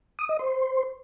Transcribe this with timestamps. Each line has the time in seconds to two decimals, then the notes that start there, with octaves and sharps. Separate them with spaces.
0.19 D#6
0.29 D#5
0.39 C5